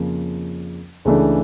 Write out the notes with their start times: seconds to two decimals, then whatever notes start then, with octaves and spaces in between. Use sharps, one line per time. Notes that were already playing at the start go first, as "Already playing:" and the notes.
Already playing: F2 C#3 F3 A#3
1.05 C#2 C#3 E3 A3 D4